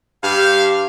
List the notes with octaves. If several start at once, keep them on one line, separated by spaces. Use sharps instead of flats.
G2 G4 F5